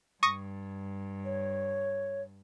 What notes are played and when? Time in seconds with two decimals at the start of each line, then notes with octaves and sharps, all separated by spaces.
0.23 G2 C#6 D#6 A#6
1.25 C#5